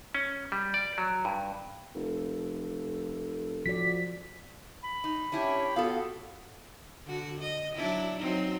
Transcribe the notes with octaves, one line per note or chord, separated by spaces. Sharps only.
C#4
G3
D5
F#3
G2
F1 A4
F3 F#4 D5 B6
B5
D#4
C#4 D4 E4 G4 C#5 G5
B3 F4 F#4 A4 F5
D3 F#4
D#5
F#3 D4 E4
F#3 C4 D#4